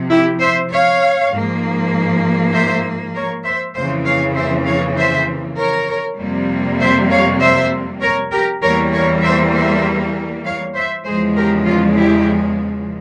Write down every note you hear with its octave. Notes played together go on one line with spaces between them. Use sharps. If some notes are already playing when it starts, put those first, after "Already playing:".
Already playing: C3 F3
E4 G4
C5 E5
C#5 F5
G#2 F3 A#3
C5 E5
A#4 C#5
C5 E5
F2 C#3 E3 A#3 C5 E5
C#5 F5
C5 E5
C#5 F5
C5 E5
A#4 C#5
F2 C3 G3 A#3
C5 E5
C#5 F5
C5 E5
A#4 C#5
G4 A#4
E2 E3 G3 A#3 A#4 C#5
A#4 C#5
C5 E5
C5 E5
C#5 F5
C5 E5
E2 C#3 F3 G#3 G#4 C5
G4 A#4
C#4 F4
E4 G4